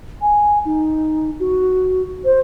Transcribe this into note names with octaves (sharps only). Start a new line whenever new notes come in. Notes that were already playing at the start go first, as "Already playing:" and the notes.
G#5
D#4
F#4
C5